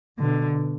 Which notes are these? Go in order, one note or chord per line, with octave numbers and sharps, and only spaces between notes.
B2 D3